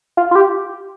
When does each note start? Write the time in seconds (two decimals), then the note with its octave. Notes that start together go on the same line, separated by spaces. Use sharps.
0.17 F4
0.31 F4
0.35 G4